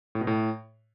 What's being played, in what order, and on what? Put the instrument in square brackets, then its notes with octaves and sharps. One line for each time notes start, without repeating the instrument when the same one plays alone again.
[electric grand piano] A2
B2
A2